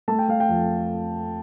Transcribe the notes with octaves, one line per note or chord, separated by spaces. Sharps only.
A3 A5
G5
A3 F5
G5
F2